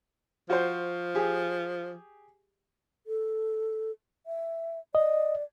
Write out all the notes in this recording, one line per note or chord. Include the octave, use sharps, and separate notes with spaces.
F3 F#4 C5
G4 G#4
A4
E5
D5 D#5